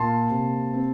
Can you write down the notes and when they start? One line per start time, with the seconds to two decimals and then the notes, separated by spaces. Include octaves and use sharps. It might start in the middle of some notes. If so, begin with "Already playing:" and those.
Already playing: A#2 A#3 A5 C6
0.30 C3
0.73 C4